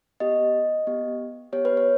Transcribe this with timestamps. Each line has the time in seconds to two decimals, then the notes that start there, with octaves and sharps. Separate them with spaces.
0.20 B3 G4 D#5
0.87 B3 G4
1.53 B3 G4 C#5
1.65 B4
1.77 C#5